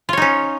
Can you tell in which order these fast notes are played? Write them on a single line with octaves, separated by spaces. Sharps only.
F4 C#5 D#4 C#4